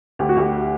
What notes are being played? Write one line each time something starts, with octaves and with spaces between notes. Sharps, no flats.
D2 G4
F#4
D2 G4